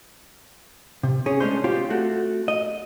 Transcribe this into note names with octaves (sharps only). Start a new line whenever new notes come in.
C3
C#4 G#4
G#3 A3 C#4 D4 C5
C4 F4 G4
A3 F#4
D#5